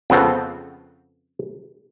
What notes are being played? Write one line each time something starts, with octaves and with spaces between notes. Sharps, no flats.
F2 C#3 B3 C4 A4